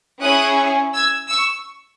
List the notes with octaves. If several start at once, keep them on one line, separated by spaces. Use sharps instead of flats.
C#4 E4 G#4 D#6 F#6
E6 G#6
C#6 E6